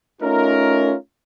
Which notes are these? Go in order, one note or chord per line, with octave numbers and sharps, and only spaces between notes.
A3 C#4 D#4 F4 A#4